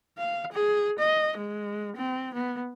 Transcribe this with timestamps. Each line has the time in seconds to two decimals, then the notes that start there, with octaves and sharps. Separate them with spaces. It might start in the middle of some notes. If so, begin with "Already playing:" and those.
0.18 F5
0.52 G#4
0.99 D#5
1.37 G#3
1.97 C4
2.34 B3